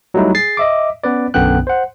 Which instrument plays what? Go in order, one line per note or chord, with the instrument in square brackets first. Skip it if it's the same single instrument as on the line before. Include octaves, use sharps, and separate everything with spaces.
[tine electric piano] F#3 G3 A3 D#4 E4
G#4 A6 C7
D#5 E5 D6
B3 C#4 B4 D5
B1 F#2 D3 B3 G5 F#6
C5 F#5